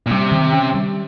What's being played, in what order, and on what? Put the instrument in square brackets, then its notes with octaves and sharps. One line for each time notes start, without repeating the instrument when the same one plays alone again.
[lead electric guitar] A#2
[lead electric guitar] C3 [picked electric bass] G3
[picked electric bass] D#3
C#4
G3